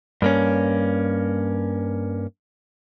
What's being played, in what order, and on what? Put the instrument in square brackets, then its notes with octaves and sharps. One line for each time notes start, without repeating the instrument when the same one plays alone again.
[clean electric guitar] G2 A#3 C#4